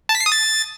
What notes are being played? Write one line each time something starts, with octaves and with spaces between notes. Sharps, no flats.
A5
B6
C7
D#6
A6